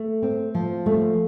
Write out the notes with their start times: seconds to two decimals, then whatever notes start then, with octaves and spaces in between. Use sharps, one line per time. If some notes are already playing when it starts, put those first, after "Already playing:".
Already playing: A3
0.22 C4
0.55 F3
0.86 A3